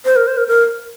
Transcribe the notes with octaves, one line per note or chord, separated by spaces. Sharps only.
C5
A#4
C5
A#4
A#4